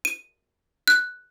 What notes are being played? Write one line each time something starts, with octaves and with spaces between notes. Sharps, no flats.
D#7
F#6